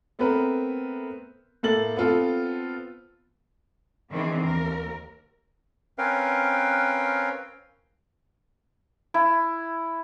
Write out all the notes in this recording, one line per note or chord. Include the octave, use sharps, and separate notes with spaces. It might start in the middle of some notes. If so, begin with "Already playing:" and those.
A3 B3 C4 A#4 B4
A2 A#3 A4 A6 F#7
B3 C4 F4 A4
D#3 E3 B3 C4 D4 G#4
D#2 A#4
C4 C#4 A#4 B4 F5 G5
E4